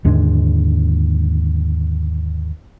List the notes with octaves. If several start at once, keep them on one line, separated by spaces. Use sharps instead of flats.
D#2 G#2 D3 G#3